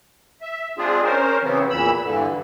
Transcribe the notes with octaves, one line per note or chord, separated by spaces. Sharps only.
E5
G#3 C4 D4 F4 G#4
C#4 A#4 C5
C#3 E3 F#3 B3 C4
E2 A#2 E3 B5 E6
G2 D3 E3